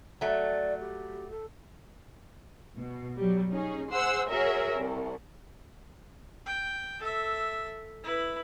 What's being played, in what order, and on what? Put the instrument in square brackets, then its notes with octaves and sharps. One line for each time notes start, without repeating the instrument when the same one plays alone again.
[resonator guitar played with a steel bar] F#3 A3 [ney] D5
[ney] G4
A4
[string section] B2
F#3 G3
C#4 D#4 G#4
G#4 C5 F#5 C6 E6
F#4 G#4 A#4 C#5 E5
C2
[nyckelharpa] G5
A4 E5
E4 B4